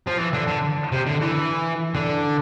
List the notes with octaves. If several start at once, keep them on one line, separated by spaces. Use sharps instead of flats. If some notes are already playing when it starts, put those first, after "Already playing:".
F3
E3
D3
D3
C3
D3
E3
D3